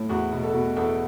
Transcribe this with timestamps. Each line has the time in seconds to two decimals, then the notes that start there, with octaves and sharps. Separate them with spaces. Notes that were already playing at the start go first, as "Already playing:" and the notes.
Already playing: A2
0.09 E2 F#4
0.32 B2
0.43 A4
0.54 B2
0.76 E2 A4